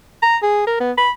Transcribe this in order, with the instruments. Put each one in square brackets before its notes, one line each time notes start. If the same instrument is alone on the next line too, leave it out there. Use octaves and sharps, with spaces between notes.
[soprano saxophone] A#5
G#4
A#4
B3
B5